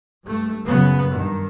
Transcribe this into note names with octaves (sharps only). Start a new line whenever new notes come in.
G2 A3
F#2 C#3 B3
G2 D#3